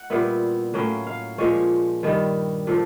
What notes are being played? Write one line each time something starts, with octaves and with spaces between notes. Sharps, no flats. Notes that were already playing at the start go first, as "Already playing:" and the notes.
Already playing: F#5
A#2 G3 B3 E4
A2 F#3 A#3 C#4 G5
F5
A#2 F3 G#3 C#4 C#5
G2 D#3 G3
A#2 F3 A4